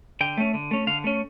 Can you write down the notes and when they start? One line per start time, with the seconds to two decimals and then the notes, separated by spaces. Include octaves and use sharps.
0.21 D3 G5
0.37 A3 C#4
0.54 D3
0.71 A3 C#4
0.87 D3 F5
1.04 A3 C#4